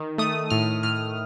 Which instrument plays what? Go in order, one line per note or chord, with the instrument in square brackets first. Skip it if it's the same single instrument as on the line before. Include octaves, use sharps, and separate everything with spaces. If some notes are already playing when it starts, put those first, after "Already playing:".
Already playing: [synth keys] D#3
A3 D#6
A2 F6
A2 F6